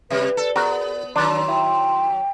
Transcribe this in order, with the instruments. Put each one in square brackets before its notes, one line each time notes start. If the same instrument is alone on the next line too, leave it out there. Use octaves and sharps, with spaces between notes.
[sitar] C3 G3 [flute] B4 [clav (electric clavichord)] E5
[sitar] A4 [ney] D5
[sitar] B3 [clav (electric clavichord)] F#4 A#4 [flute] G#4
[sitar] D#3 F#3 [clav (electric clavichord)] D4 [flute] C6
[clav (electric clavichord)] E4 [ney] G5